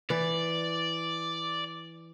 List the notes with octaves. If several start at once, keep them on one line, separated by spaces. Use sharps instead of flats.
E3 D5